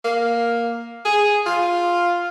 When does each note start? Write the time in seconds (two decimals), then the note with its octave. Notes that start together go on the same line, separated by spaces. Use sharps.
0.04 A#3
1.05 G#4
1.46 F4